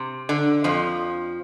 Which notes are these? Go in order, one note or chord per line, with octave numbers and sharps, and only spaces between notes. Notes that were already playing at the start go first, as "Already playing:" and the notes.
Already playing: C3
D3
F2 F3